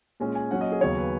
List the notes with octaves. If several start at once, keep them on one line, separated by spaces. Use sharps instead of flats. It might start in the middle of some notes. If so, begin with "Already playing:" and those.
A#2 G#3 C#4
G#5
A#2 F#3 C#4 F#5
D#5
G#4
D#2 C#3 F#3 B3 C#5
B4